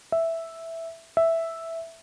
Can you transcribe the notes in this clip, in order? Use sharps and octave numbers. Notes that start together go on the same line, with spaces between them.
E5
E5